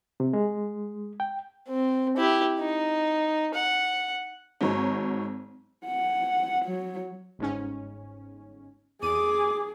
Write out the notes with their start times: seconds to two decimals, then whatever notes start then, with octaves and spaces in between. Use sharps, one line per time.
0.20 C3
0.33 G#3
1.20 G5
1.68 C4
2.17 E4 G4
2.59 D#4
3.54 F#5
4.61 G#1 G#2 F#3 D#4 C#5 A#5
5.86 F#5
6.66 F#3
7.39 G1 G#2 C#4
9.03 E2 G#4 D6 D#7